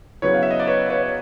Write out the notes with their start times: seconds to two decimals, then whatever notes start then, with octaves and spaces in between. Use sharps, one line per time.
0.22 C#3 F#3 B3 E4 B4 C#5
0.34 F5
0.43 E5
0.51 D#5
0.60 D5
0.67 B4 C#5
0.90 B4 C#5
1.03 C#5